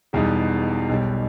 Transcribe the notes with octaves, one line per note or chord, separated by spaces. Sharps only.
E1 E2 B2 G3 D#4
B1 B2 G3